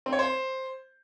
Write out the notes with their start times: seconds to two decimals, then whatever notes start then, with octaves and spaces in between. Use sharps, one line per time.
0.06 C4
0.12 C#5
0.19 C5